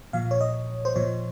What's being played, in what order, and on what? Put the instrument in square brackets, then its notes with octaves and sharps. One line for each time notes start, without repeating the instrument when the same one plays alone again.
[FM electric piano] A#2 F3 F5
C#5
D#5
C5
A#2 F3 C#5